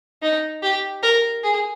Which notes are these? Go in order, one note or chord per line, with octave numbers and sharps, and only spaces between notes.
D#4
G4
A#4
G#4